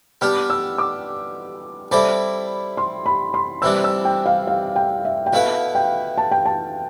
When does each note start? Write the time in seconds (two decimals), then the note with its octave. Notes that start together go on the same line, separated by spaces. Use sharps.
0.21 G3 B3 D4 G4 F6
0.50 E6
0.78 D6
1.91 G3 C4 E4 A4 D5 B5
2.77 C6
3.06 B5
3.34 C6
3.62 C3 E3 G3 D4 E6
3.84 E6
4.05 G5
4.26 F5
4.47 F5
4.76 G5
5.05 E5
5.26 G5
5.33 B2 A3 E4 B4 F5
5.75 G5
6.18 A5
6.31 G5
6.45 A5